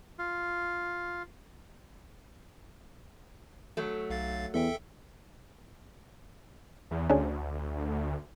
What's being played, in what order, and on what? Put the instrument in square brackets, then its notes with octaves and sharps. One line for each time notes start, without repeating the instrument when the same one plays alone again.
[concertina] F4
[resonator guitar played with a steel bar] F#3 A3
[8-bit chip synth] B1 F5 A6
[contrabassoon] E2 [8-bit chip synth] A4 E5 G5
[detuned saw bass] E2
[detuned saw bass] D2 [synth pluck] C#4 D4 G#4